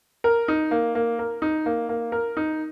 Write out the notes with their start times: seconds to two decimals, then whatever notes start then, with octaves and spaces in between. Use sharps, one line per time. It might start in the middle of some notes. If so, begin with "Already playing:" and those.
0.24 A#4
0.48 D#4
0.71 A#3
0.95 A#3
1.19 A#4
1.42 D#4
1.66 A#3
1.89 A#3
2.12 A#4
2.37 D#4